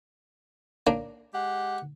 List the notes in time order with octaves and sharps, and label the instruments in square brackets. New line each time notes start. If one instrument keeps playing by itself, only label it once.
[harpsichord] A#3 D4
[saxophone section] G#3 G4 F#5